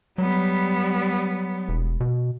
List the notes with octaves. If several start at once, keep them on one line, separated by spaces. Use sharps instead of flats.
F#3 G3 B3
E1
B2